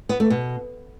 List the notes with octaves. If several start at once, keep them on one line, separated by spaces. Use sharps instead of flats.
B3
A3
B2